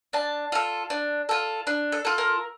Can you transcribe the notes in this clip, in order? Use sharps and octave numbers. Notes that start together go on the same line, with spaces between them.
D4 A5
F4 A4
D4
F4 A4
D4
A4
F4 A4
A#4